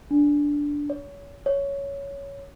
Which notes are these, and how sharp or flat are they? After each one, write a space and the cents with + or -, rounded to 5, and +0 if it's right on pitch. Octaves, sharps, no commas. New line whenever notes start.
D4 -10
C#5 +30
C#5 +10